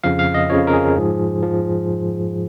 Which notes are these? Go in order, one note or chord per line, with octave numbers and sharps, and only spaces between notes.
F2 C#3 F3 F5
F5
D#5
F2 C#3 F3 C#5
A#4
G#4
G#2 F3
F3